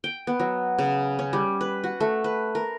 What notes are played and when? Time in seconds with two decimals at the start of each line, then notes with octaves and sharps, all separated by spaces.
0.04 G5
0.27 B3
0.40 F#3
0.78 C#3
1.19 C#4
1.33 G3
1.61 B4
1.84 F#4
2.00 A3
2.24 B4
2.55 A#4